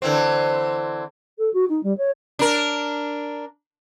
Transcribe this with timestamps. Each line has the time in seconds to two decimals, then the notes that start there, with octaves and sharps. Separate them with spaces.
0.02 D3 E3 C4
1.38 A4
1.53 F#4
1.68 D#4
1.83 G3
1.97 C#5
2.39 D4 A#4